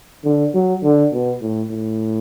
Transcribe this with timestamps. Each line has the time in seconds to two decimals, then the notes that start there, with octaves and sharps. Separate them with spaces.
0.25 D3
0.54 F#3
0.84 D3
1.13 B2
1.42 A2
1.71 A2